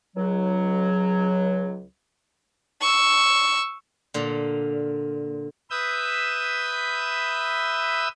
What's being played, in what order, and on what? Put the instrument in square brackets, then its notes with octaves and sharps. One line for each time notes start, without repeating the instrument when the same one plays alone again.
[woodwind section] C#2 F#3
[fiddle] C#6 E6
[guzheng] A#2 D3
[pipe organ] B4 E5 D#6 E6 G6